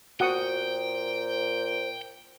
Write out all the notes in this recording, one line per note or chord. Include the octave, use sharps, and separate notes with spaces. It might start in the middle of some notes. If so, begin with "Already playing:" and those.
A#2 F#4 C5 F#5 G5 D#6